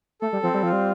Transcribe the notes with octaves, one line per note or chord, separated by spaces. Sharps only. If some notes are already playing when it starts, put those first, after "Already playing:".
A3 A4
G3
F3 C4
G3
F3 F4
G3